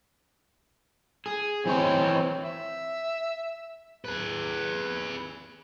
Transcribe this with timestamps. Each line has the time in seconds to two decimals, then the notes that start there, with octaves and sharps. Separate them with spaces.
1.26 G#4
1.66 E3 C4 D#4 C#5
2.44 E5
4.05 G#4 B4